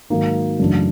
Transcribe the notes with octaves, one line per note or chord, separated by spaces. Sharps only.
G#2 D#3 F#3 A#3 D#4
F#2 C#3 E3 A3 D4